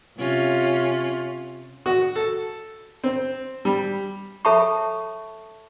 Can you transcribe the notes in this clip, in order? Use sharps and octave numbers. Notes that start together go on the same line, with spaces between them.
C3 C#4 F4
F#4
A4
C4
G3
A4 C#5 E5 A5 B5 C#6